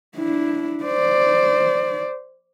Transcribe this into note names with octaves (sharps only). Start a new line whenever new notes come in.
D4 E4
C5 D5